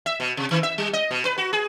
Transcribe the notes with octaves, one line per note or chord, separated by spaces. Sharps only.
E5
B2
C3
D#3
E5
G3
D#5
B2
B4
F#4
G#4